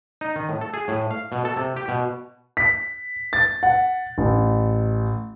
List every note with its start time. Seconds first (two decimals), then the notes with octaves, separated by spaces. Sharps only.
0.21 D#4
0.36 D#3
0.49 A2
0.61 A4
0.74 G#4
0.88 A2
1.11 F5
1.32 B2
1.45 A4
1.56 C3
1.76 G4
1.88 B2
2.57 B6
3.33 A6
3.63 F#5
4.18 A1